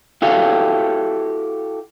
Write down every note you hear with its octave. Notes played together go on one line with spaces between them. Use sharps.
E4 F#4 G4 A4 F5